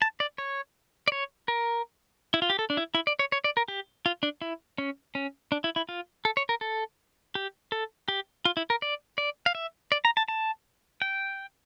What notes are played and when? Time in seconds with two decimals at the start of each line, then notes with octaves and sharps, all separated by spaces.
0.02 A5
0.20 D5
0.38 C#5
1.08 D5
1.12 C#5
1.48 A#4
2.34 E4
2.42 F4
2.50 G4
2.59 A4
2.70 D4
2.77 E4
2.95 E4
3.07 D5
3.19 C#5
3.32 C#5
3.44 D5
3.57 A#4
3.68 G4
4.06 F4
4.23 D4
4.42 E4
4.78 C#4
5.15 C#4
5.52 D4
5.64 E4
5.76 E4
5.89 F4
6.25 A4
6.37 C#5
6.49 A#4
6.61 A4
7.35 G4
7.72 A4
8.08 G4
8.45 F4
8.57 E4
8.70 A#4
8.82 D5
9.18 D5
9.46 F5
9.55 E5
9.92 D5
10.05 A#5
10.17 A5
10.28 A5
11.02 G5